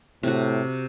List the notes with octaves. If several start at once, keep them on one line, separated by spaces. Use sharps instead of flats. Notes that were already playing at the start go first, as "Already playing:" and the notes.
A2 C3 F#4